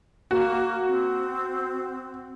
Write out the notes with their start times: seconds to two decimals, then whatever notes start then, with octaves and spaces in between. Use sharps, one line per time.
0.31 A#3 F#4
0.88 C4